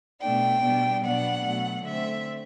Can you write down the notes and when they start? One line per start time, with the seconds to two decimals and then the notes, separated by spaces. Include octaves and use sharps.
0.21 B2 A3 D4 G5
0.63 B2 G3 B3 D4
1.04 B2 F#3 B3 D4 F#5
1.46 B2 F#3 A3
1.87 D3 A3 C4 E5